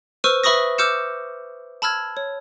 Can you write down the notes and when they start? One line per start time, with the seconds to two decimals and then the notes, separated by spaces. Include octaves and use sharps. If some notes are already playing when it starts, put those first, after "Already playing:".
0.24 B4 C5 C#6 E6 F6 D#7
0.44 B4 E5 B5 C#6 D#6 A#6
0.78 D6 E6 F6 G6 C#7 E7
1.82 A5 B5 E6 F6 G#6
2.17 C#5